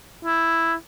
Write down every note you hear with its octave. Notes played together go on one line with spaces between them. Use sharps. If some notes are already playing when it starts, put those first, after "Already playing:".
E4